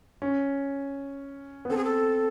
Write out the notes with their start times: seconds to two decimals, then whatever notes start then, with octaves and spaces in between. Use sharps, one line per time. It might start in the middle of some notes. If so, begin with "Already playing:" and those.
0.22 C#4
1.65 B3
1.70 C4 A4
1.76 G#4
1.84 A4